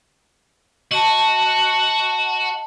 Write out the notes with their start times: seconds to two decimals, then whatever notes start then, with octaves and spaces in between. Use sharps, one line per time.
0.91 F#4 D#5 A5